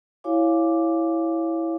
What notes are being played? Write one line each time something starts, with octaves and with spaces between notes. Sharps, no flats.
E4 F#4 C#5 F5 G#5 D6